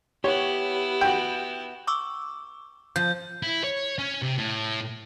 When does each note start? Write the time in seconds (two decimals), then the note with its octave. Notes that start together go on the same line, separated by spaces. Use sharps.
0.24 B3 E4 G4 C#5
1.01 F#4 G5
1.87 C#6 D6 E6
2.96 F3 G6
3.43 E4
3.64 C#5
3.98 C#4
4.22 C3
4.37 A2